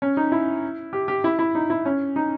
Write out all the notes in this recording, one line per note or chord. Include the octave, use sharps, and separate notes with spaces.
C#4
D#4
E4
G4
G4
E4
E4
D#4
E4
C#4
D#4